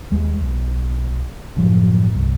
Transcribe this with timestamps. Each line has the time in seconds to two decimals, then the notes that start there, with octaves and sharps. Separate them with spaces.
0.11 D#2 G#3
0.41 B1
1.56 F#1 A2 F3 F#3
2.10 G1 C2